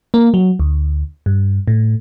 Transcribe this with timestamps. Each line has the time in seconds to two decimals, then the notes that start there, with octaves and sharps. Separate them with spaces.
0.14 A#3
0.34 F#3
0.59 D2
1.26 G2
1.68 A2